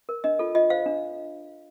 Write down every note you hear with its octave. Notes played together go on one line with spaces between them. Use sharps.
A#4
D4 D#5
F4 A4
F4 D#5
C5 F5
D4